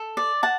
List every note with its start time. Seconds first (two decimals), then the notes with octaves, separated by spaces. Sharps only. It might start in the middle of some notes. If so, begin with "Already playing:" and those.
Already playing: A4
0.17 D5
0.43 F#5 A5